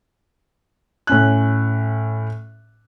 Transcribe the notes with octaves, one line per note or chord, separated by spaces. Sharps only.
A2 C#4 F#6